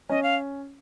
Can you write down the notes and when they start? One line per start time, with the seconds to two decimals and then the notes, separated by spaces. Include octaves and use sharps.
0.09 C#4 D#5
0.23 F5